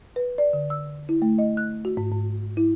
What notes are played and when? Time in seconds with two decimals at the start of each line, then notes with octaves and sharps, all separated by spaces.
0.16 B4
0.38 D5
0.53 D3
0.70 E6
1.09 E4
1.22 A3
1.38 D#5
1.57 F#6
1.85 F#4
1.97 G#2
2.12 G#2
2.57 E4